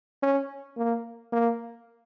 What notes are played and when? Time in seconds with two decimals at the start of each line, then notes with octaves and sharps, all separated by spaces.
0.23 C#4
0.77 A#3
1.32 A#3